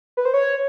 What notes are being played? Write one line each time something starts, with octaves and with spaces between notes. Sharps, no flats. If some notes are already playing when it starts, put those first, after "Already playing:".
B4
C5
C#5